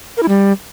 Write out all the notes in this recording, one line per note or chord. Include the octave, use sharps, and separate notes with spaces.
A#4
E4
G3